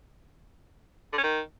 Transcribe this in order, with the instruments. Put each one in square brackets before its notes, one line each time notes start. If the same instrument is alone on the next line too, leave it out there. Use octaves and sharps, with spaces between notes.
[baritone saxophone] D3
C#4
D#3